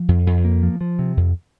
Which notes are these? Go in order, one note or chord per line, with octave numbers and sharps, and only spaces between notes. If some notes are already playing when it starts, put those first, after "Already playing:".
Already playing: F3
F2
F2
A#3
F3
F3
C3
F2